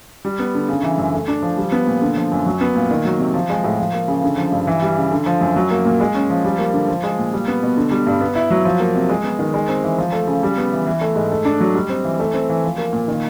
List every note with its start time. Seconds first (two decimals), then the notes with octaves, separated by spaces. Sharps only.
0.25 G3
0.39 B3
0.55 D3
0.69 C#3
0.83 E3
0.98 F#2
1.13 A3
1.28 D4
1.43 F3
1.57 G3
1.72 B3
1.87 A#2
2.02 D3
2.17 F3
2.32 F#2
2.46 F#3
2.61 B3
2.76 A#2
2.91 D#3
3.05 F#3
3.19 C3
3.34 F3
3.50 G#3
3.64 A2
3.79 F3
3.93 A#3
4.08 C#3
4.24 D3
4.37 F3
4.52 G2
4.67 E3
4.83 G3
4.97 C#3
5.11 D3
5.26 F3
5.41 F#2
5.56 F#3
5.71 A#3
5.85 A#2
6.01 G#3
6.15 C#4
6.30 F3
6.45 G3
6.59 A#3
6.74 D3
6.88 F3
7.03 G#3
7.18 A#2
7.33 G3
7.48 B3
7.63 B2
7.77 D3
7.91 G3
8.07 G2
8.21 B3
8.35 E4
8.51 F#3
8.65 F3
8.80 A#3
8.95 C3
9.09 G#3
9.24 B3
9.39 D#3
9.54 G#3
9.68 C4
9.84 E3
9.98 F3
10.13 A3
10.27 C#3
10.43 G3
10.58 B3
10.72 E3
10.87 E3
11.01 A3
11.16 G#2
11.31 A3
11.45 D4
11.61 F#3
11.75 G3
11.89 C4
12.04 E3
12.19 A3
12.34 C4
12.49 E3
12.64 F3
12.78 A#3
12.93 A#2
13.08 D#3